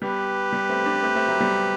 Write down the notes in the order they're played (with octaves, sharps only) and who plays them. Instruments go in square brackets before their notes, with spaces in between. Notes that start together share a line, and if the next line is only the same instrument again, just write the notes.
[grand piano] G3 B3 [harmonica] G4 B4
[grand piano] G3 B3
A3 C4
B3 D4
A3 C4
A3 C4
F#3 A3
G3 B3